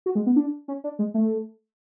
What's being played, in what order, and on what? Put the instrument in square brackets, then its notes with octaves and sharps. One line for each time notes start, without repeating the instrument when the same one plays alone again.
[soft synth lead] F#4
G#3
B3
D4
C#4
D4
G#3
A3